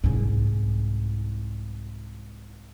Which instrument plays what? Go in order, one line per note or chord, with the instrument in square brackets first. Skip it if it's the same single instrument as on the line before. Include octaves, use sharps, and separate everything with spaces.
[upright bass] C2 G#2